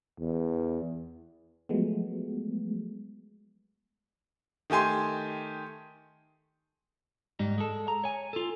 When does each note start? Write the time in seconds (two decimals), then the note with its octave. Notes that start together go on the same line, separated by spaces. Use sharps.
0.19 E2
1.69 F3 F#3 G#3 A3 B3
4.70 D#3 A3 G4 G#5 C6
7.39 G#2 G3 D#4
7.58 G#3 A4
7.88 A#5
8.04 C#5 G#5
8.33 F4 A4